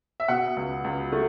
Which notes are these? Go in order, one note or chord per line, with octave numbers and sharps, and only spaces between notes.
E5
B2 F#5
C#2
C#2
A3